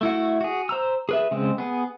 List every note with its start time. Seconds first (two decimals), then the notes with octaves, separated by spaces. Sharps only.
0.01 A3 E4 F#4
0.41 F#4 G#4
0.69 C5 A#5 E6
1.09 G#4 B4 E5
1.31 C#3 G#3 C4
1.58 B3 G#4